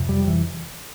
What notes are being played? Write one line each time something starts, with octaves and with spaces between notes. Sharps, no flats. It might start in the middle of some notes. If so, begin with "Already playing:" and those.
Already playing: F2 C3
G3
E3